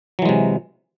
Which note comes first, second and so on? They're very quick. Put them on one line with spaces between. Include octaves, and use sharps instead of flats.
F#3 E3 G#3 C3